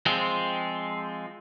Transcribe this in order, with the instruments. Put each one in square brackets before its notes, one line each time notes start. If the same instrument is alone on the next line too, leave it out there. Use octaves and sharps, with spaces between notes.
[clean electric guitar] F3 G#3 C4